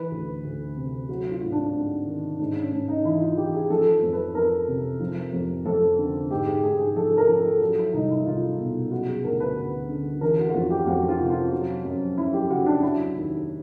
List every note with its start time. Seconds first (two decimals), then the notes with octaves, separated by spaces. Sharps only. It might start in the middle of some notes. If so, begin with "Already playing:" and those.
Already playing: E3 B4
0.11 D2
0.44 D2
0.77 C3
1.09 F#3 F#4
1.31 F4
1.42 G#2
1.52 D4
1.74 G#2
2.07 D#3
2.39 G#2 D4
2.56 C#4
2.72 G#2 D4
2.88 D#4
3.05 E3 E4
3.21 F4
3.37 E3 G4
3.54 G#4
3.70 F3 A4
4.03 F2
4.13 B4
4.35 F2 A#4
4.68 C3
5.00 F3
5.33 F2
5.66 F2 A4
5.98 D3
6.31 G#2 G4
6.47 G#4
6.63 G#2 G#4
6.79 G#4
6.95 F3 A4
7.17 A#4
7.29 F3
7.40 A4
7.61 F#3 A4
7.78 E4
7.93 C2 D#4
8.10 E4
8.26 C2 F4
8.59 B2 F4
8.91 F#3 F#4
9.08 G#4
9.24 D2 A#4
9.40 B4
9.57 D2
9.89 D3
10.21 E3 A#4
10.38 F#4
10.49 F#4
10.54 F2 F4
10.70 G4
10.87 F2 F#4
11.08 F4
11.20 C3
11.30 F4
11.52 F#3
11.85 F#2
12.18 F#2 E4
12.33 G4
12.50 C#3 F#4
12.66 D4
12.83 F#3 E4
13.15 D#2